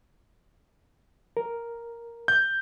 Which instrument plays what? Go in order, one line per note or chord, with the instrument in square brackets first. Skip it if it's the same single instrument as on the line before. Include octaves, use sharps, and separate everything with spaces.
[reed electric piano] A#4
[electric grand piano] G6